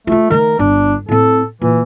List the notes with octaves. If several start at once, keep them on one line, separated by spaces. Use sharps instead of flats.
A3 E4 F4
D#3 A3 A#4
G1 D4
A2 C4 A4
A#2 E3